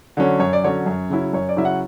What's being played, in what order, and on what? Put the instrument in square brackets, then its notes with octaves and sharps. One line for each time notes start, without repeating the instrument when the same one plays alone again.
[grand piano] D3 F#3 C#4
F#2 C#5
D5
D3 F#3 C#4 C#5
F#2
C#3 F#3 C#4 E4
F#2 C#5
D5
C#3 F#3 C#4 E4 E5
F#5